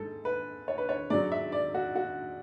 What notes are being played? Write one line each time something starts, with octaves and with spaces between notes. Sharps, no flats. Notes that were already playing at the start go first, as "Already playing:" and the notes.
Already playing: G#2 A4
B4
C#5
B4
C#5
G#2 F#3 D5
E5
D5
F#4
F#4